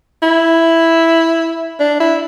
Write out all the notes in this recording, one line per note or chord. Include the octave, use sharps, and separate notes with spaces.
E4
D4
E4